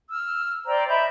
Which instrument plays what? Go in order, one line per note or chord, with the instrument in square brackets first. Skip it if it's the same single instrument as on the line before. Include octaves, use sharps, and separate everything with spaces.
[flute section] E6 F6
C5 D5 G5 A#5
D#5 E5 B5 G6